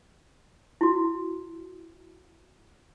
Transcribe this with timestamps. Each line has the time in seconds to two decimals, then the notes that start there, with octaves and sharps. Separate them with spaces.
0.81 E4 F#4